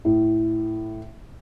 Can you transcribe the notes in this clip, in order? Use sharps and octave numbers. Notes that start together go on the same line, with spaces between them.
A2